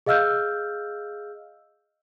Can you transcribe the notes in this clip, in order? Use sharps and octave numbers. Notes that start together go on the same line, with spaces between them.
G#4 D#5 F5 E6 F6 G6